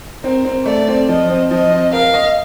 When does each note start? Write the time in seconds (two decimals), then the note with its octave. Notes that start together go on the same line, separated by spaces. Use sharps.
0.23 C4 A#4
0.45 C4
0.65 A3 D5
0.88 C4
1.08 F3 D#5
1.30 C4
1.51 F3 D#5
1.72 C4
1.93 A#4 F5
2.14 D#5